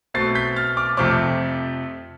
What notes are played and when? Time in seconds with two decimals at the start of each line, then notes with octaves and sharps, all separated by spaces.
0.14 B2 A3 C4 A6 C7
0.35 G6 B6
0.56 F6 A6
0.77 D6 F6
0.97 F2 C3 F3 A3 C4 D6 F6